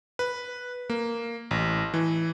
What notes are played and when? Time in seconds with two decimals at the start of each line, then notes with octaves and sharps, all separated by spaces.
0.19 B4
0.90 A#3
1.51 A1
1.94 E3